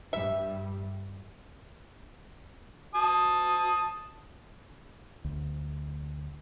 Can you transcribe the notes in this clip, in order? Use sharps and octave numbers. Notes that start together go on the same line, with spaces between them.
G2 G3 E5
A5 D#6
D2